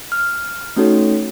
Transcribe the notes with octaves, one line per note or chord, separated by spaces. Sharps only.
F6
A3 C#4 D#4 F#4 A4 C#5